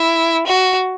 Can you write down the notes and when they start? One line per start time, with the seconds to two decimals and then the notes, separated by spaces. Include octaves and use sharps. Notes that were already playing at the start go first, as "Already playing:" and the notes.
Already playing: E4
0.47 F#4